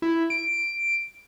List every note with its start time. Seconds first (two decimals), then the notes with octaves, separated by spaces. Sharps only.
0.02 E4
0.30 D7